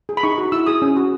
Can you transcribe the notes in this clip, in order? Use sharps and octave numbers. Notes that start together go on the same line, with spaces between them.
G#4
B5
D#4 C#6
F#4
E4 E6
G#4 D#6
C#4
F#4